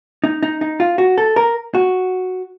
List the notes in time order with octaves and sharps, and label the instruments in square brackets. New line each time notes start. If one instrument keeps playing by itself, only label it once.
[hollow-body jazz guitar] D#4
D#4
D#4
F4
F#4
A4
A#4
F#4